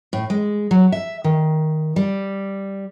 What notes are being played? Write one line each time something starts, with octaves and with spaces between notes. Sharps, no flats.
A2
G#3
F#3
E5
D#3
G3